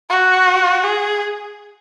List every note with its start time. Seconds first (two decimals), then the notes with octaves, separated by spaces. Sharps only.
0.09 F#4
0.83 G#4